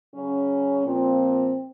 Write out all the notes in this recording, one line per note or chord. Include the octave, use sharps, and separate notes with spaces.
C#3 F#3 C#4
A#2 F3 C4